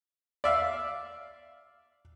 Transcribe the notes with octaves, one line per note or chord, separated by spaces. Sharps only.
D5 E5 F5